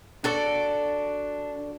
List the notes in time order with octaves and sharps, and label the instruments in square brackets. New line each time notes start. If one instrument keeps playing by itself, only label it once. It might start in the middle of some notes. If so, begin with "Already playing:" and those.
[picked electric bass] D4 [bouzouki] F#4 A4 D5